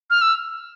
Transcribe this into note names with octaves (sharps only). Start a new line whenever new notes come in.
F6
E6